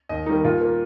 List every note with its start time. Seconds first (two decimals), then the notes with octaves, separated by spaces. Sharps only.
0.09 D#2 D#5
0.26 D#3 G3 A#3 D#4
0.44 A#2 F4
0.61 A#3